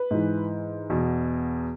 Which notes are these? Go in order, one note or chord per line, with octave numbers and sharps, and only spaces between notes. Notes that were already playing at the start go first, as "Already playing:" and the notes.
Already playing: B4
G#2 E3
E2 B2